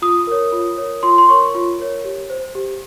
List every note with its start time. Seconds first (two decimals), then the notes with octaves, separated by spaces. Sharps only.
0.02 F4 D#6
0.27 A#4 C#5
0.52 F4
0.78 A#4 C#5
1.03 F4 C6
1.18 C6
1.29 A#4 C#5 C#6
1.55 F4
1.79 A#4 C#5
2.04 G4
2.30 C5
2.55 G4